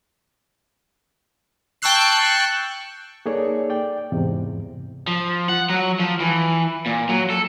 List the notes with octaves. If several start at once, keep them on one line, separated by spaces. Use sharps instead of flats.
G5 A5 C#6 E6 F#6 C7
A#3 D#4 G#4 A4 C#5 D5
D5 G5
E2 G#2 C3
F3
F#5
F#3
F3
E3
A#2
F#3
A4